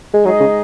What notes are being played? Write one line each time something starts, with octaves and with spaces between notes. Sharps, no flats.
G#3
F#3 G#3 D#4 G#4 D#5
C#3